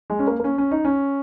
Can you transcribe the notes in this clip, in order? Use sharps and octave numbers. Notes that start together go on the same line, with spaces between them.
G#3
C#4
A#3
A#3
C#4
C#4
D#4
C#4